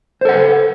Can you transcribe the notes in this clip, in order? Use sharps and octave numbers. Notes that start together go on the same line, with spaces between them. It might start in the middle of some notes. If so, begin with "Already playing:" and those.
A4 B4 C5 F#5